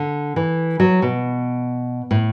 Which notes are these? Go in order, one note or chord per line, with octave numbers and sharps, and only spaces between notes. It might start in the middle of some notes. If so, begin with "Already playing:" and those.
Already playing: D3
E3
F#3
B2
A2